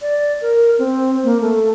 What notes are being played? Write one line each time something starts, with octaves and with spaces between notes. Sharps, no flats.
D5
A#4
C4
A#3
A3